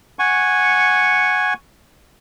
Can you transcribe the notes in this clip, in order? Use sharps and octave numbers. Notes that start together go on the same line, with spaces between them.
F#5 G#5 C#6